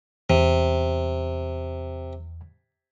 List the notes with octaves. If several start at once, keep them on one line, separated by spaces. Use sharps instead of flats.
E2 C3